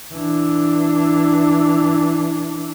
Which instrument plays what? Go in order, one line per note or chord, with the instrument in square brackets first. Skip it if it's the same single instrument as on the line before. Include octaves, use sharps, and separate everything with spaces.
[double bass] E3 D4